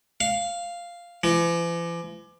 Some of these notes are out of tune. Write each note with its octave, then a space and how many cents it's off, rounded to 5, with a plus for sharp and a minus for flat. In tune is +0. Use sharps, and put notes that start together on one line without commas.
F5 -5
E3 +45